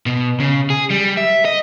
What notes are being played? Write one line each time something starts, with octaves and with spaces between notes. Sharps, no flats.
B2
C#3
G#4
G3
E5
D#5